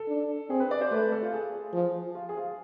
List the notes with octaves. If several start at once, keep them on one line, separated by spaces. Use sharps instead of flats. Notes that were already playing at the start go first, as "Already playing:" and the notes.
Already playing: A4
D4
C4 G#4
B4
D5
C5
A3 B4
A4
F4
G#4
F3
F4
G#4
F4